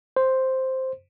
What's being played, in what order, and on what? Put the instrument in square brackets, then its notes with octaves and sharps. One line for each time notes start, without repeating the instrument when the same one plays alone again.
[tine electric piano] C5